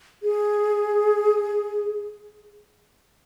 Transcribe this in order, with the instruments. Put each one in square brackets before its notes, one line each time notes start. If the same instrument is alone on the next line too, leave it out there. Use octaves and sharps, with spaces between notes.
[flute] G#4